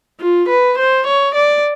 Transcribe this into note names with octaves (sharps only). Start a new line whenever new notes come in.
F4
B4
C5
C#5
D5